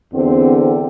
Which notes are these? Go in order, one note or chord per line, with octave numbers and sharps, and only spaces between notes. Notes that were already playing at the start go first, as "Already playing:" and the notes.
E2 D3 C4
C4